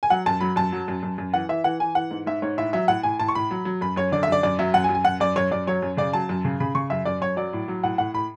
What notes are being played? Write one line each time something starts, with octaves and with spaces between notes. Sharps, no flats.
G#5
F#3 F#5
F#2 A5
F#3 B5
F#2 A5
F#3
F#2
F#2
F#2
E3 F#5
E3 E5
E3 F#5
E3 G#5
E3 F#5
G#2
G#2 E5
G#2 C#5
A2 E5
F#3 E5
A2 F#5
A2 G#5
A2 A5
C#6
A2 B5
F#3
F#3
F#2 B5
F#2 C#5
D3 D5
E5
F#2 D5
F#2 D5
F#3 E5
F#2 F#5
G#5
F#2
G#5
F#2 F#5
F#2 D5
F#2 C#5
F#2 D5
F#3 C#5
F#2
C#3 D5
F#3 A5
F#2
C#3
C#3 B5
C#3 C#6
F#2 E5
F#2 D5
F#2 C#5
F#3 D5
A2
F#3
A2 F#5
A2 F#5
A2 B5